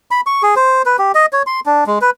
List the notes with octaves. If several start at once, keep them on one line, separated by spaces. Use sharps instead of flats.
B5
C#6
G#4
C5
B4
G4
D#5
C#5
C6
D4
G#3
B4